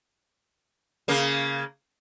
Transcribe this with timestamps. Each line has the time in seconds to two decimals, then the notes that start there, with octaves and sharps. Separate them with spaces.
1.08 C#3 A#3